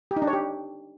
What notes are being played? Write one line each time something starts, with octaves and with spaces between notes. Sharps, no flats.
G4
D#4
D4
C#5
G4